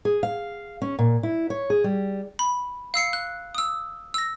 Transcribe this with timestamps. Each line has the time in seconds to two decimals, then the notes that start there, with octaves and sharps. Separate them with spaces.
0.05 G#4
0.23 F5
0.82 C#4
0.99 A#2
1.23 E4
1.50 C#5
1.70 G#4
1.84 G3
2.39 B5
2.94 F5 E6 C7 C#7
3.13 F#6
3.55 D#6 E6
4.14 E6 A#6